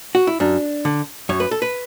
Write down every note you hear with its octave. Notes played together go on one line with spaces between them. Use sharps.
F#4
E4
F#2 D4
D3
F#2 C#5
B4
A4
B4